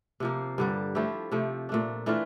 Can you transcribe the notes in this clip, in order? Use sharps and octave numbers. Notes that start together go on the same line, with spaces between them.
C3 F3 A#3
G2 D3 G3
F3 A3 E4 G4
C3 F3 A3
A#2 A3 D4
E3 A3 D4 F4